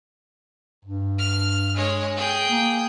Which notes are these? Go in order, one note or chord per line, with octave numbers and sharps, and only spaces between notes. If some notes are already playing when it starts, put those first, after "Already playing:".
G2
F6
G#3 C#5
G#4 G5
A#3